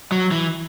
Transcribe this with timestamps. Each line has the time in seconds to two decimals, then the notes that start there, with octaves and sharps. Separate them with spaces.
0.12 F#3
0.31 E3